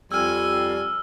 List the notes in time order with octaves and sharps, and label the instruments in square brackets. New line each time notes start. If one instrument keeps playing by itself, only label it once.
[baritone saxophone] F2 [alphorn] G3 [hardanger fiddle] G#5 [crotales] E6 F6